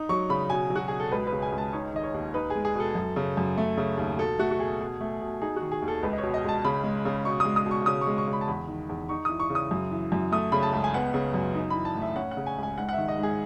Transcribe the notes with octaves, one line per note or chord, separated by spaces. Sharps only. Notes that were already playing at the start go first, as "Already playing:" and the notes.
Already playing: D#4
F#3 C#6
C#3 B5
B2 G#5
F#3
F#4
B2 G#4
A4
C#2 B4
B4
C#3
G#5
C#2
A5
D#4 C#5
D#3 D#5
C#5
D#2
D#4 B4
G#3 G#4
G#4
B2 A4
F#2
C#3
F#2
A3
C#3
D#2
B2 A4
A3 F#4
F#4
B2 G#4
B2
A3
B2
D#4 G#4
F#4
D#3
G#4
D#2
A4
C#2 B4
D#5
C#5
B2
D#5
C#2 A5
C#3 B5
G#3
C#3
B2 C#6
D#6
G#3
D#6
B2
C#6
C#3 D#6
C#6
G#3
C#6
C#3
B5
A5
E2 B5
D#3
E2
D#4 C#6
E3 D#6
C#6
C#3
D#6
F#2
E3
F#2
A3 D#6
C#3 B5
A5
C#2
G#5
B3 F#5
C#3
F#2
D#4
E3 B5
A5
A2
E5
C#4 F#5
F#5
C#3
G#5
C#2
G#5
G#2 F#5
F#5
D#3 E5
D#5
G#2
G#4